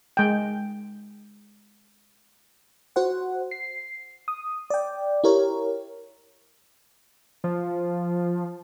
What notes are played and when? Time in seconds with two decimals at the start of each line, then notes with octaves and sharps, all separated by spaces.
0.17 G#3 G5
2.96 F#4 C5 F#5
3.51 C7
4.28 D#6
4.70 D5 G5
5.24 E4 G4 A#4 C#5
7.44 F3